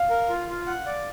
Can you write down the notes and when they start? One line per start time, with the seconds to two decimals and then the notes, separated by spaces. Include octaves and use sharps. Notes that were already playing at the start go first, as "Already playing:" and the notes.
Already playing: F5
0.10 A#4
0.29 F4
0.48 F4
0.67 F#5
0.86 D5